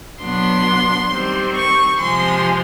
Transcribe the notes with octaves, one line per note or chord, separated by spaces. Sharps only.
B2 F#3 B3 D4 C6
D#3 G3 C4
C#6
C3 F3 G#3 C6